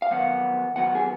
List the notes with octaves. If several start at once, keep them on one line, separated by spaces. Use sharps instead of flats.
F5
F2 D#3 F#3 B3 F#5
F2 D#3 F#3 B3 F#5
G#4